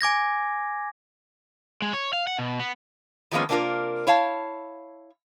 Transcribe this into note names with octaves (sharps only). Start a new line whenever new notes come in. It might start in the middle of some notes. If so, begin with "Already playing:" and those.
G#5 D6 G#6 A#6
G#3
C#5
F5
F#5
B2
B3
D#3 F3 G#3 A#3 B3 C#4
C3 A#3 D4 E4 F4 A#4
E4 C#5 F5 A5